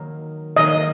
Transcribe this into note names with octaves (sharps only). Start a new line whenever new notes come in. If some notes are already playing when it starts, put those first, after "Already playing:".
Already playing: D#3 F#3 A#3
D#3 F#3 A#3 D#5